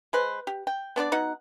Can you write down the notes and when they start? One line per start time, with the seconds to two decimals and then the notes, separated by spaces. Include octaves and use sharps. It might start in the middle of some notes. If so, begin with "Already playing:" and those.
0.13 G#3 B4 C5
0.47 G4
0.67 G5
0.96 B3 D4 C5 D5
1.12 B2 D#4 F#5